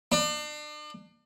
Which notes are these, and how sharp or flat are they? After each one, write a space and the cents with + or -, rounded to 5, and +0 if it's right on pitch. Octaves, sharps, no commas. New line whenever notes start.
D4 +35